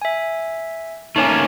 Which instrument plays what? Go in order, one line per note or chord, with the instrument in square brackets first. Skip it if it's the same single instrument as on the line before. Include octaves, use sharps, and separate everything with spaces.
[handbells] E5 G#5
[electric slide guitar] A3 A#3 C#4 [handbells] D#4 C#5 G#5